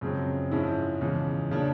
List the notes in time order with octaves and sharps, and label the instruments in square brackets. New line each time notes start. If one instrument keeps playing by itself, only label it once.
[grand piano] F#2 C#3 F3 G#3 C4
G#2 F3 G#3 C#4 E4
E2 C#3 F3 G#3
C#3 F3 A#3 D4